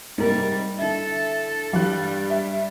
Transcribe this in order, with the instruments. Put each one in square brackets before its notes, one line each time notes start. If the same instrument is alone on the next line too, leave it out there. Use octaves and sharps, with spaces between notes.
[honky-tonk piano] G#2 C3 A#3 [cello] G3 [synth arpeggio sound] A3 A#4
[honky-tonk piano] D3 E4 [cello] A4
[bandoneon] G2 [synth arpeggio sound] E3 F#3 [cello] G3 [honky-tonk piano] F5 F#6
[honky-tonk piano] E5